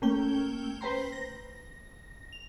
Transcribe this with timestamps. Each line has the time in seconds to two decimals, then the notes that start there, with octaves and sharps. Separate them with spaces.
0.02 A3 A#3 C#4 G5 G7
0.81 B4 C5 G5 A#5 C6
1.12 A#6
2.33 F7